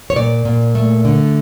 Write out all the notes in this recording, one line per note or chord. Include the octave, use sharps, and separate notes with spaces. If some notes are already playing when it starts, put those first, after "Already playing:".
C#5
A#2 D5
A#2
A3
D3